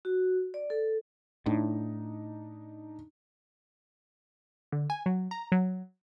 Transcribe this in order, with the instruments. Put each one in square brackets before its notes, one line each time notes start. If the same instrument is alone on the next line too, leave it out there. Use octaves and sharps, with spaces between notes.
[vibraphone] F#4
D5
A4
[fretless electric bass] A2 [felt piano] D4 D#4
[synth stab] D3
G#5
F#3
A#5
F#3